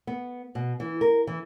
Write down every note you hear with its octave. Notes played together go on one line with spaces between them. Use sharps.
B3
B2
E3
A#4
E3